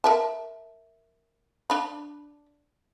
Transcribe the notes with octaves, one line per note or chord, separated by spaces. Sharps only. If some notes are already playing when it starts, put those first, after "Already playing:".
A#4 E5 A5
D4 B5